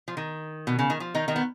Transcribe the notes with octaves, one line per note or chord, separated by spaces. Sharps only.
F3
D#3
B2
C#3
D#3
F3
D#3 D#4
D#3 D#4
B3